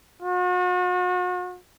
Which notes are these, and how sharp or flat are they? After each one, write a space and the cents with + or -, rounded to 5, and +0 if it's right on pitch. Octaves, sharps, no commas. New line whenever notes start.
F#4 -40